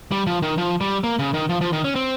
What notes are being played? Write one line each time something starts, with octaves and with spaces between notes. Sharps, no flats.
G3
F3
D#3
F3
G3
A#3
C#3
D#3
F3
F3
D#3
C#4
C4